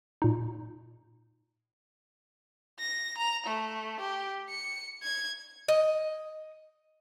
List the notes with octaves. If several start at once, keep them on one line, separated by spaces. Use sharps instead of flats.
A#2 D#4
A#6
A#5
A3
G4
C#7
G#6
D#5